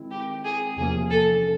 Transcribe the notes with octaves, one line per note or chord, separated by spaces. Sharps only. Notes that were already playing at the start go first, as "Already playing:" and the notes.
Already playing: D#3 G#3 C4 E4
G4
G#4
E2 C3 F3 A#3 C#4 G#4
A4